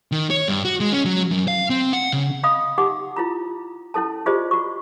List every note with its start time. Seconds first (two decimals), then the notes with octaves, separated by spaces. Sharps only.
0.12 D#3
0.30 C#5
0.48 G2
0.64 F#4
0.80 G#3
0.93 C#4
1.05 F#3
1.31 F#2
1.48 F5
1.70 C4
1.93 F#5
2.13 C#3
2.43 D#5 F5 B5 D#6
2.78 D#4 G4 F#5 D6
3.17 E4 F4 A#5
3.94 C#4 E4 A4 A5
4.26 F4 G4 G#4 C5 D5 D#5
4.51 F#4 C#6